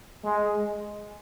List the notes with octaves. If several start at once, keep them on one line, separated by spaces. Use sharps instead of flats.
G#3